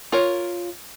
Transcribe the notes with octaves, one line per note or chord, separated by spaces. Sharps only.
F4 A#4 C#5